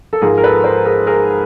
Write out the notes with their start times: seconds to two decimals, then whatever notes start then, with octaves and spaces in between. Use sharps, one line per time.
0.13 A4
0.22 G#2 F3 G#3 G#4 A#4
0.38 A#4
0.44 A4 B4
0.64 A#4 C5
0.86 G#4 A#4
1.07 G#4 A#4